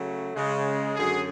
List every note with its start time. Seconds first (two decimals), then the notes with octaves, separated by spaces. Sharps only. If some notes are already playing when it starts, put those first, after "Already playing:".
Already playing: C#3 F#3 A3
0.35 C#3 G#3
0.96 F#2 D3 F#3 G#4